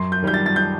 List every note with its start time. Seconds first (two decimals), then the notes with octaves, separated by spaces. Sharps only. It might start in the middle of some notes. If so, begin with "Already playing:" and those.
Already playing: F#2 C6
0.12 G6
0.22 D#3 G3 G6
0.34 A6
0.46 A6
0.56 G6